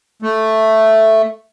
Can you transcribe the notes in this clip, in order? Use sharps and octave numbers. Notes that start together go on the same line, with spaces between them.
A3